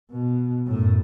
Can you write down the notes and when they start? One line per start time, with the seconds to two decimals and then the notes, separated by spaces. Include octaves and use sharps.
0.11 B2
0.67 F#2 A2